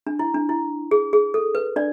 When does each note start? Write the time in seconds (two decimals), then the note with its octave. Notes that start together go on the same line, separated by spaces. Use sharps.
0.07 D4
0.19 E4
0.34 D4
0.49 E4
0.91 G#4
1.13 G#4
1.34 A4
1.55 B4
1.76 D4 D5